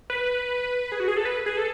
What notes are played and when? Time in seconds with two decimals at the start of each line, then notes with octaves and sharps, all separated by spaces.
0.10 B4
0.92 G#4
1.00 F#4
1.08 G#4
1.17 A4
1.25 B4
1.46 G#4
1.57 A4